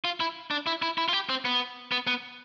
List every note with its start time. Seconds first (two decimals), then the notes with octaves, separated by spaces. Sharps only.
0.05 F4
0.20 E4
0.51 D4
0.67 E4
0.82 E4
0.98 E4
1.09 F4
1.13 G4
1.29 C4
1.45 B3
1.92 B3
2.07 B3